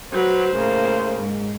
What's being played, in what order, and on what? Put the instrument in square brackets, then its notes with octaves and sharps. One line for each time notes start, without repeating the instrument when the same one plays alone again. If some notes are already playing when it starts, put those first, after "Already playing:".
[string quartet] F#3 B4 [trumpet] C5
[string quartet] A2 C#3 A#3
G#2